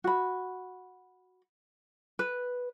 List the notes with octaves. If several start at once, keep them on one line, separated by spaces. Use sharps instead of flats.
F#4 B5
B4